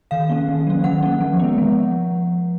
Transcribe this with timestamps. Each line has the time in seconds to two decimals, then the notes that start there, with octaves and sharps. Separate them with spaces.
0.11 D#3 F5
0.30 A#3 C#4
0.48 D#3
0.67 F#3 C#4
0.84 D#3 F#5
1.03 A#3 C#4
1.20 F3
1.39 G#3 B3
1.58 F3